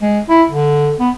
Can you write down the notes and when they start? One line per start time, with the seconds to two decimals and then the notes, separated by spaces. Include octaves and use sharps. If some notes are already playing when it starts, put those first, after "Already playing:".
0.02 G#3
0.29 E4
0.50 D3
0.99 B3